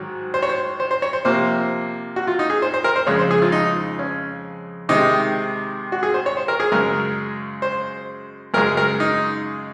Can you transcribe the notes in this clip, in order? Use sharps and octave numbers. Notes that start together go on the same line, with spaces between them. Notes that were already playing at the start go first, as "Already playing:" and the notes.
Already playing: G#2 D#3 F#3
C5
C#5
C5
C5
C5
C#5
C5
C3 F3 A#3 C5
F#4
F4
D#4
G#4
C5
C5
A#4
C5
F2 C#3 G#3 C#5
C5
G#4
F4
D#4
C#4
C3 D#3 G#3 D#4
F#4
G#4
C5
C#5
C5
A#4
G#4
F#2 C#3 G#3 A#4
C5
F#2 C#3 G#3 A#4
A#4
D#4